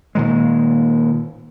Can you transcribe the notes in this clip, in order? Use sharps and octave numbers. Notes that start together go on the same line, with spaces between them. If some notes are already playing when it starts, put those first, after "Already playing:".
A#2 D#3 G#3